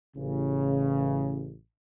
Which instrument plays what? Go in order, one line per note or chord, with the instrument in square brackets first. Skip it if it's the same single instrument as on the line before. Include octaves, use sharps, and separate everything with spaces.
[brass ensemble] A1 C#3